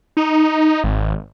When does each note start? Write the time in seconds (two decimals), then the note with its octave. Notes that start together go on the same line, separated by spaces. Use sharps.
0.17 D#4
0.84 G#1